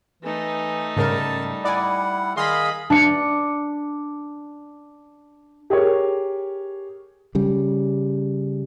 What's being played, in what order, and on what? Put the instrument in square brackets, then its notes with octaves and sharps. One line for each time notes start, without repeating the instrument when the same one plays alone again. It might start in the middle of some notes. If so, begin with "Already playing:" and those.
[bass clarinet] E3 [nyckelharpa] A3 D#4
[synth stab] G#2 C#3 A#4 [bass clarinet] G3 [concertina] A5
[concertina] E4 F#5 [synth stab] D5 G#5
[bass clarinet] D#3 [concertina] G#4 F5 [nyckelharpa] D#5 B5 [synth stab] C6
[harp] D4 C#7
[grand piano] G4 G#4 A#4 C#5
[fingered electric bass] C#3 G3